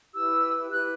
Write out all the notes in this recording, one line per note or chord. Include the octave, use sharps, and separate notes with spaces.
E4 G4 B4 E6
E4 G4 B4 F#6